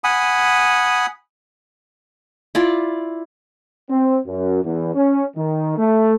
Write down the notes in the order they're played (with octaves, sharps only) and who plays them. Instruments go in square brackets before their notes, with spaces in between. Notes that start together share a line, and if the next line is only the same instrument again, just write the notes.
[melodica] F#5 G#5 B5 D#6
[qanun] E4 F4 D5
[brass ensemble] C4
F#2
E2
C#4
D#3
A3